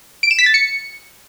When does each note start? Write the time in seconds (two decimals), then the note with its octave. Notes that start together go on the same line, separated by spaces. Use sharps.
0.23 D7
0.31 E7
0.39 B6
0.46 A6
0.54 C#7